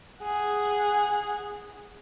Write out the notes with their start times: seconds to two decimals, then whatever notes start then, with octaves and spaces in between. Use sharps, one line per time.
0.21 G#4 F#5